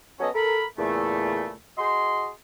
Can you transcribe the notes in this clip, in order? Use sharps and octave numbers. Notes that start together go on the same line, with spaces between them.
F#3 B3 C#4 A4 C#5 D#5
A4 A#4 B5
E2 A#2 C#3 A3
F#4 G#4 D#5 C6